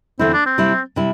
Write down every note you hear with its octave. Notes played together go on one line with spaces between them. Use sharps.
E2 D3 A3 C4 E4
D4
C4
C3 G3 E4
C3 G3 E4